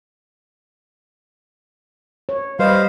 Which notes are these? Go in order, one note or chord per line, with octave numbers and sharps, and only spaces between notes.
C#5
G3 B4 C5 D#5 F5